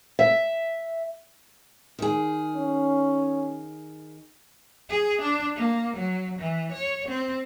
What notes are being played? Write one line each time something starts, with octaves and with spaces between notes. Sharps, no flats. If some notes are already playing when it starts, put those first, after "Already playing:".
E5
D#3 G#4
C#4
G#4
D4
A#3
F#3
E3
C#5
C4